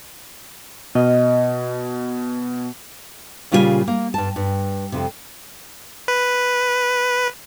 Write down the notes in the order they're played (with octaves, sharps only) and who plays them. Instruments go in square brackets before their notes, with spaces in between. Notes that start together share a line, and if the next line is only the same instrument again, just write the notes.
[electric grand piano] B2 [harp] D#5 F6
[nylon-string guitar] A#2 C#3 G3 F4 C#5 G#5
A#3
G2 A5
G2
F2 C3
[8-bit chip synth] B4